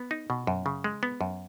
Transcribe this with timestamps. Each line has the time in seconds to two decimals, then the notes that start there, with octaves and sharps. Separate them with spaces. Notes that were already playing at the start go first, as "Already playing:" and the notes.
Already playing: B3
0.11 D#4
0.30 B2
0.47 F#2
0.66 C#3
0.84 G#3
1.03 B3
1.21 F#2